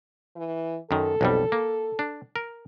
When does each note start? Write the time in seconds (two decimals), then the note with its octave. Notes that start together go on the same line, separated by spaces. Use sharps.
0.36 E3
0.91 F#2 D#3 A4
1.21 B1 F2 G3
1.52 A#3
1.99 D4
2.36 A#4